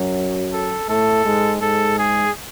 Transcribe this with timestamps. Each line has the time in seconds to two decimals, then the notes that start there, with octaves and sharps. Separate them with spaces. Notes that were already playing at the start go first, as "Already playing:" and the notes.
Already playing: F#2 F#3
0.53 A4
0.89 A2 A3 A4
1.25 G#2 G#3
1.62 G#2 G#3 A4
1.98 G#4